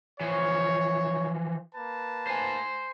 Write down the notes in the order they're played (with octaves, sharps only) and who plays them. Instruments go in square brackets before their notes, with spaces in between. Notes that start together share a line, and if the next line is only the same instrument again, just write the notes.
[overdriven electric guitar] E3 F3 [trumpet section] C#5
[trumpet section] A#3 B4 A5
[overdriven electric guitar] C5 G#5